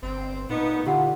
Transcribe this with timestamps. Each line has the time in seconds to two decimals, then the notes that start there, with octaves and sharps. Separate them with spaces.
0.03 G1 C4
0.50 A#2 D3 A3 B3 D#4
0.86 D3 E3 F4 G4 F#5